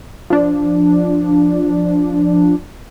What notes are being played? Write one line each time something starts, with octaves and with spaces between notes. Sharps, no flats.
F3 D4